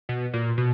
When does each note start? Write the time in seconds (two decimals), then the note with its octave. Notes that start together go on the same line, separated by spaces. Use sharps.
0.09 B2
0.33 A#2
0.58 B2